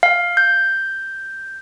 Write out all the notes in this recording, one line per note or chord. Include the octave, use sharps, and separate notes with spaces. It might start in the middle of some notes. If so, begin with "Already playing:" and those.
F5
G6